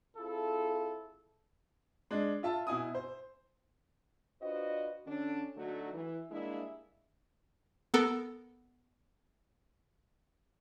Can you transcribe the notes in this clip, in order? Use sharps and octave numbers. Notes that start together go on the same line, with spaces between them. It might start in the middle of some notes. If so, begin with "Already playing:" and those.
C4 E4 F4 G#4 A4
G#3 D4
F4 E5 A5
B2 E4 G#5 D#6
C5
D4 F4 F#4 B4 C5 D#5
D3 C#4 D4
D3 F#3 A3 D#4 F#4
E3
G3 G#3 A#3 D4 E4
B3 A4 A#4